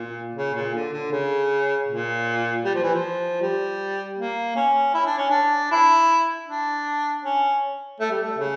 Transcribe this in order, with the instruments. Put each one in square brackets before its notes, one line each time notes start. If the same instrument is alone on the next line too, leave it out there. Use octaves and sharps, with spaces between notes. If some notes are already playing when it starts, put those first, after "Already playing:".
Already playing: [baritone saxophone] A#2
C#3
A#2
D3
D3
C#3
A#2
G3
F3
E3
F3
G3
A#3
C#4
E4
D4
C#4
D4
E4
D4
C#4
A3
G3
A3
C#3